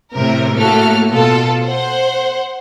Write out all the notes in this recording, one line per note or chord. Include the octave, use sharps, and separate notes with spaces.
A2 C3 A#4
A2 A3 A#3 F#4 A4 F6
B2 F4 A4
C5 F#5